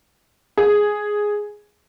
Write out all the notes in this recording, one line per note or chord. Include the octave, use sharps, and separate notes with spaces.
G#4